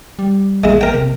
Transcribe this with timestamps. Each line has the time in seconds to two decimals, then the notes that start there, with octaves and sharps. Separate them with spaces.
0.19 G3
0.64 A#1 G#3 E4
0.81 A#4 G5
0.94 C3